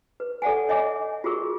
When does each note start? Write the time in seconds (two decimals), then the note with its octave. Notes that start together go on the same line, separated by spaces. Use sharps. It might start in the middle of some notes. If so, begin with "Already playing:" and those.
0.20 B4
0.42 A4 D5 F#5 G#5
0.69 C#5 D#5 E5 G#5 D6
1.24 F4 F#4 G#4 A#4 C#6